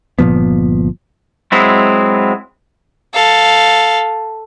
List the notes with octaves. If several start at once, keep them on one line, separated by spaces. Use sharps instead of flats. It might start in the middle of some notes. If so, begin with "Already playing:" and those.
G1 A#2 F3 B3
F#3 G#3 C4 E4
A4 F5